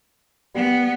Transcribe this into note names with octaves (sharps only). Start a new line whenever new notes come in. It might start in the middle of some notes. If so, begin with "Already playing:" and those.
G3 B3 F#5